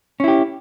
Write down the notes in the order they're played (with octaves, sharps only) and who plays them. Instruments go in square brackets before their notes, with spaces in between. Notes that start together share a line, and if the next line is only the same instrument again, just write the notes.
[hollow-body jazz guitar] C#4
E4
G4